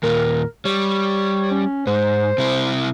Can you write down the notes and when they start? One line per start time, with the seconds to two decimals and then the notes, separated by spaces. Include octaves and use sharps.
0.03 D#2 A#2 A#4
0.65 G3 C#5
1.51 C#4
1.87 G#2 C5
2.38 C3 E4